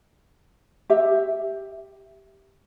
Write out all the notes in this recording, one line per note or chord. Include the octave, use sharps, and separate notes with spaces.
G4 E5